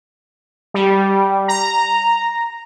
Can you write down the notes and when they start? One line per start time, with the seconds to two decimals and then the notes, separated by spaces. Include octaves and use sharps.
0.74 G3
1.48 A#5